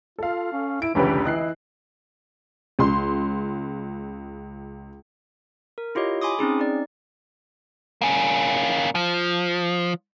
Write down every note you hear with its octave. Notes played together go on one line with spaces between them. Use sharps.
F4 A4 F5
C#4
E4 D7
F1 C#2 D3 E3 C#4 G4 B4
E3 E4 D#5 F#6 C7
C#2 C6
A#4
E4 F4 G4 C#5 D#5
G#5 B5 C6 D6 D#6
C4 C#4 D#4 G#4
D#4 D5
A#3 C#4
F3